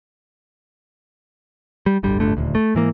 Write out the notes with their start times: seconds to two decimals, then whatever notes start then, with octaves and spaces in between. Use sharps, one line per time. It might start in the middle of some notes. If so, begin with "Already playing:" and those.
1.86 G3
2.03 D1 G1 D3 G3
2.20 D1 G1 D3 A3
2.37 D#1 D2
2.55 A3
2.75 G#2 E3 A#3